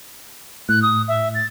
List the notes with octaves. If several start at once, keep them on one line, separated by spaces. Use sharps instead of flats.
A2 F#6
D#6
E5
A6